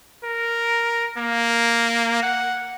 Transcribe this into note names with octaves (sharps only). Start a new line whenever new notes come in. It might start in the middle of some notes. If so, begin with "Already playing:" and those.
A#4
A#3
F#5